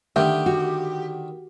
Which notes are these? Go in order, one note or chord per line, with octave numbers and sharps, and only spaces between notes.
D3 D#3 A3 G4 E5
F#4